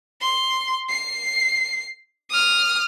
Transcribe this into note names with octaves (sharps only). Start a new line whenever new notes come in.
C6
C7
D#6 F6